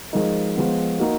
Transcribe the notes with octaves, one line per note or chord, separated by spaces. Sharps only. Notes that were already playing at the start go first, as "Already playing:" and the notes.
F3 G#3 D#4 A#4
F3 G#3 B3
A#3 D#4 F#4 A#4